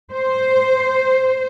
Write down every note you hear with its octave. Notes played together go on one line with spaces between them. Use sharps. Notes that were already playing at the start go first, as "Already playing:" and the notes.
C5